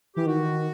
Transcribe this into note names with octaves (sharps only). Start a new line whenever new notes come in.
E3 G4
D#3 F#4